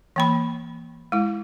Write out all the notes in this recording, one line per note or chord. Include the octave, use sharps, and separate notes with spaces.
E3 A#3 B5
G#3 E4